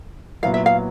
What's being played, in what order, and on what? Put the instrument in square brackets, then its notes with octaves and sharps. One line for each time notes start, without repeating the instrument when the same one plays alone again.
[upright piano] A#2 F#3 B3 E4 [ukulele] F5
[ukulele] E5
F5